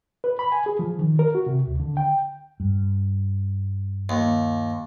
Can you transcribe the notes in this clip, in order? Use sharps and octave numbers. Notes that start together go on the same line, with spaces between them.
B4
B5
G#5
G#4
F3
D#3
A#4
F#4
C3
D2
D3
G5
G2
D#2